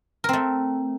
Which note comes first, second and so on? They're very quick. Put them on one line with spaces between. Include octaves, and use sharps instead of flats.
A#4 C4 A3